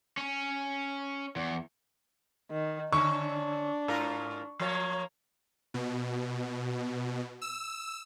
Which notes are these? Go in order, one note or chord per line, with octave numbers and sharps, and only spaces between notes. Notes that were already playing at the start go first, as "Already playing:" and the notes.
C#4
E2
D#3
D3 C#4 D4 C#6
G#2 F4 A#4
F3 A#3 C#5
B2
E6